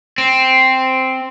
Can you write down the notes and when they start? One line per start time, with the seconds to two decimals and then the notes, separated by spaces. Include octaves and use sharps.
0.18 C4